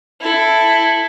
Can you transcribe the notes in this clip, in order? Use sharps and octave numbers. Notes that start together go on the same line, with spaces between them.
E4 A4